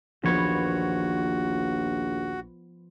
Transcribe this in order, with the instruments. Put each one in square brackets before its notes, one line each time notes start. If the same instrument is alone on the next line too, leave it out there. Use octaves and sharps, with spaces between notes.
[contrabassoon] A#1 [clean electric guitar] D#2 C#5 [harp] F3 B3 [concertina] F#4